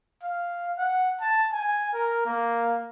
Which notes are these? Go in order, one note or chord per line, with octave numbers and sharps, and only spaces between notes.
F5
F#5
A5
G#5
A#4
A#3